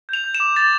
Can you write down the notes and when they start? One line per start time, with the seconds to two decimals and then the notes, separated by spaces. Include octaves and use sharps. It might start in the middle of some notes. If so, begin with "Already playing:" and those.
0.09 G6 F7
0.24 G6
0.35 E7
0.40 D6
0.56 D6 A6